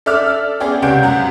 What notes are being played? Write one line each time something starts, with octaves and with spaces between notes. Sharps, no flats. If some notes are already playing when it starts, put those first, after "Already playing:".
A4 D5 E5 D6 F6
B3 C#4 G#4 D5 G5
C#2 C3 C#5 F#5 G6 D7
F#2 F#5 A#5